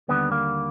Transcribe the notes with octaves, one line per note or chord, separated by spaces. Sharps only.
D#2 D3 G3 B3
A#3